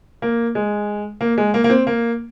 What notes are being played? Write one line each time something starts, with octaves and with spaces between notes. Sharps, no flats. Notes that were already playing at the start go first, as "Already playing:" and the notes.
A#3
G#3
A#3
G#3
A#3
A#3
C4
A#3